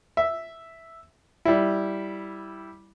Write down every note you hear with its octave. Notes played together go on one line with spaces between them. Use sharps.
E5
G3 E4